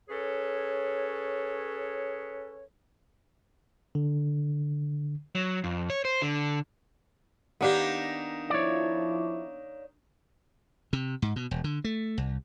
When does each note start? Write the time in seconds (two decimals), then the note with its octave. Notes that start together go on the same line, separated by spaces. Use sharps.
0.09 C#4 G#4 A4 B4 C#5
3.95 D3
5.35 F#3
5.64 F2
5.90 C#5
6.05 C5
6.22 D3
7.61 D#3 A#3 B3 D4 G4
8.50 F3 E4 C#5 D5
10.93 C3
11.22 G#2
11.36 B2
11.51 E1
11.64 D3
11.84 A3
12.18 C2